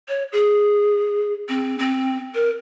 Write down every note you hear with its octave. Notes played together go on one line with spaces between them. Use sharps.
C#5
G#4
C4
C4
A#4